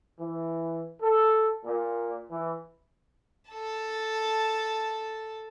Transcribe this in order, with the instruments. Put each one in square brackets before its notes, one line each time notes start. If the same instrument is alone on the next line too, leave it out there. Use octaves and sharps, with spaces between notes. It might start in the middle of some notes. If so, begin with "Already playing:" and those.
[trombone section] E3
A4
A#2
E3
[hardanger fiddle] A4 A5